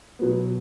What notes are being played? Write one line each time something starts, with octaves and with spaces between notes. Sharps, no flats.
B2 F#3 B3